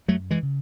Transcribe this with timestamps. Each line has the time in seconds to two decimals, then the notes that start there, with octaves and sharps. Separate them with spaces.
0.08 F#2 F#3 A3
0.31 E3 G#3
0.43 C#3